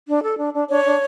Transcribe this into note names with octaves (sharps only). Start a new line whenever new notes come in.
D4
A4
D4
D4
D4 C#5
D4